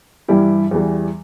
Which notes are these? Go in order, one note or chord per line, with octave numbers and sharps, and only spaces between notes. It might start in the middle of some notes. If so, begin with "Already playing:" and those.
G2 E3 G3 E4 G4
E2 E3 G3